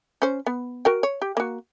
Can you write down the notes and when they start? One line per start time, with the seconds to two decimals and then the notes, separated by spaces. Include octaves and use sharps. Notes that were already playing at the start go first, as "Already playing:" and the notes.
0.22 C#4 C5
0.46 B3
0.85 F#4 A#4 G5
1.03 C#5
1.22 G4
1.37 A#3 F#4